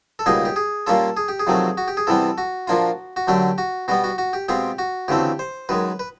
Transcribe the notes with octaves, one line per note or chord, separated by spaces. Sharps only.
A4
C#2 B2 G3 A#3 D#4 G#4
G4
G#4
A#2 G3 A#3 C#4 F4 A4
G#4
G4
G#4
F2 C3 D#3 F#3 A3
F#4
G4
G#4
E2 C3 E3 G3 B3 A4
F#4
A#2 F3 A#3 D4 F4
F#4
F#2 D3 F#3 A3 D4 G4
F#4
B2 G3 B3 F#4
F#4
F#4
G4
B2 G#3 C4 F4 G4
F#4
D2 C#3 E3 A3 C4 G4
C5
F#2 D#3 G#3 B4
B4